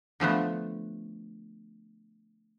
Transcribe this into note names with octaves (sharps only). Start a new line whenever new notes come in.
D3 F3 A3 B3